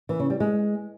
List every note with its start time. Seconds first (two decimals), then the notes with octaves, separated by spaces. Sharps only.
0.09 E3
0.20 C#3
0.30 G3
0.40 G#3